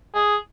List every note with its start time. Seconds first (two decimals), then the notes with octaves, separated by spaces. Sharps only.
0.15 G#4